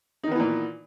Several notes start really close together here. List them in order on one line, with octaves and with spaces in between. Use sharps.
D#4 D#3 B3 E3 A#2